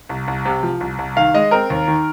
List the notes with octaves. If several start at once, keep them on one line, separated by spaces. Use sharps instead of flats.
C2
C2
C3
F3
C2
C2
D#3 F5
G#3 D#5
C4 A#4
D#2
D#3